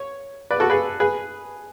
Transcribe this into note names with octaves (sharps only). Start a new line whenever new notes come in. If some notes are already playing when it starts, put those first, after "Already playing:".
Already playing: C#5
B4 D5
F#4 A4
G#4 B4
G#4 B4